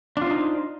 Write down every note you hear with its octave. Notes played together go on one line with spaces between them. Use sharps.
D4 D#4 F4 C5